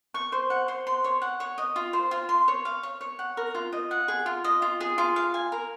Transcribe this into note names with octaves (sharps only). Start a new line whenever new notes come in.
C#6
C5
F#5
C5
C6
C#5
F#5
C#5
D#5
F4
C5
F4
C6
C#5
F5
C#5
C#5
F#5
A#4
F4
D#5
F#5
G#4
F4
D#5
F4
G#4
F4
F5
G#5
A#4